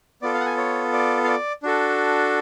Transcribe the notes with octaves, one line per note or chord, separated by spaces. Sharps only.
B3 F4 A4 D5
F5
F#5
G#5
C#5
D5
F5
D5
D4 F#4 A4